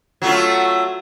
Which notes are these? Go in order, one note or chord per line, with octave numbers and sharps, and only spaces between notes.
F#3 A3 F4